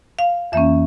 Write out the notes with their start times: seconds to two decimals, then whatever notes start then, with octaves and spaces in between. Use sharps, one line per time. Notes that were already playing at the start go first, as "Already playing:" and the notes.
0.19 F5
0.52 F2 E3 A#3 C#4 E5